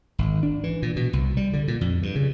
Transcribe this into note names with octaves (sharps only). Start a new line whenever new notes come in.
G#1
D4
E3
A#2
B2
C2
G3
D3
A#2
F2
G2
C#3